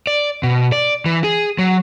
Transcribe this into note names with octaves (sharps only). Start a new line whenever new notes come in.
D5
B2
D5
E3
G#4
F#3